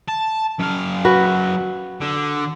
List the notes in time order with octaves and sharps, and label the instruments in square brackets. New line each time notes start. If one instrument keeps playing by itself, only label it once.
[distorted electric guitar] A5
F#2 F5
[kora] F#4 B4
[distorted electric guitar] D3